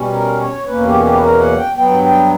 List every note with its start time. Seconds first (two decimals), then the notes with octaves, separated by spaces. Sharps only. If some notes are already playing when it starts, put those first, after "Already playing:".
Already playing: B2 G3 C#4
0.12 A#4
0.39 C#5
0.66 E2 B2 A#3 C#4 B4
0.85 G4
1.03 G4
1.14 B4
1.21 A#4
1.40 F#5
1.58 G5
1.76 G2 F#3 B3 G5
2.03 G5